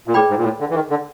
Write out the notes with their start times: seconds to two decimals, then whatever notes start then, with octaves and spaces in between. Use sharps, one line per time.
0.07 A#2
0.14 A2 G#4 B4 D5 G5 B5
0.30 G#2
0.37 A#2
0.44 A2
0.60 D3
0.70 E3
0.75 D#3
0.90 D3